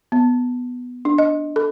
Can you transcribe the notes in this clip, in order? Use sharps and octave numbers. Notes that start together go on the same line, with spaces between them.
B3
D4
D#5
A4